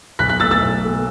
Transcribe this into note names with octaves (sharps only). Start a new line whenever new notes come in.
B1 F#6 B6
F#6 B6
B2 A3 E6 A6
E6 A6
B1
B2 A3